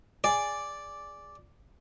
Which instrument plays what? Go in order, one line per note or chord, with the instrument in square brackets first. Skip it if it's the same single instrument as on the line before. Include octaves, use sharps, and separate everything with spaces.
[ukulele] G#4 [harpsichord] D5